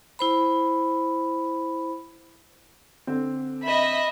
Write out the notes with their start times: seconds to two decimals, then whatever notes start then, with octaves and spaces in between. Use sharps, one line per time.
0.19 E4 C5 B5
3.07 D3 C4
3.63 D#5 E5 B5